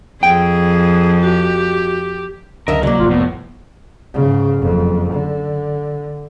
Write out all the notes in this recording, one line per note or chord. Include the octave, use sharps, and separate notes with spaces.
F2 G#4 G5
F#4 G4
C#2 F#2 D3 A#4 D#5 E5
C2 F#3 A#3
G#1 F2 F4
A2 B3
G#2 C#3
F#1 F2
D3